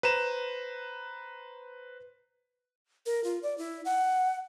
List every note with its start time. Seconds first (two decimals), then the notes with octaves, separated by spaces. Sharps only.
0.03 B4 C5 A#5 E7
3.06 A#4
3.24 F4
3.43 D5
3.58 E4
3.85 F#5